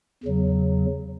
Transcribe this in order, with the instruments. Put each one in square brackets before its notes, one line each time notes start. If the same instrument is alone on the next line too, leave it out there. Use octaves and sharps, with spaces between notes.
[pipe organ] E2 C#3 F#3